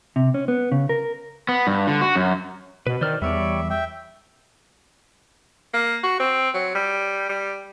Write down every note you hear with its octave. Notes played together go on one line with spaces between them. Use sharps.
C3
C#4
B3
C#3
A#4
B3
G2
D3
F#4
F#2
B2 B4
D#3 C5 D5 F6
E2 G3 C#5 D5 E5
E5 G5
A#3
F#4
C4
F#3
G3
G3